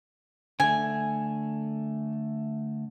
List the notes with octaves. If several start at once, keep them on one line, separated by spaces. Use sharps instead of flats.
D3 A3 G#5